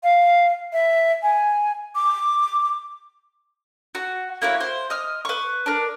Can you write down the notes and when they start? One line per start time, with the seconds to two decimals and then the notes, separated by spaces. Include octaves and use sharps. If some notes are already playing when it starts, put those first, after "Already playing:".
0.03 F5
0.73 E5
1.23 G#5
1.95 D6
3.95 F#4
4.42 A#3 E4 F#4 C#5
4.60 C5
4.90 D#5 D#6 F6
5.25 B4 C#6
5.66 D4 A#4